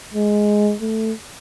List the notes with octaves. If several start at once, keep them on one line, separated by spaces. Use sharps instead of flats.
G#3
A3